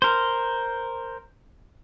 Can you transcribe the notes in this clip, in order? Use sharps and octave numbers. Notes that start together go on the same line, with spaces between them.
A#4 C5